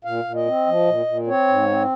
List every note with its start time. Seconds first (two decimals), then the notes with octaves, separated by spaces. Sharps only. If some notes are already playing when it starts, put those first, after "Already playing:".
0.04 A#2 F5
0.24 A#2
0.35 D#5
0.46 C4
0.66 F3
0.86 A#2
1.06 A#2
1.27 C4 C#5
1.48 G#2
1.69 C4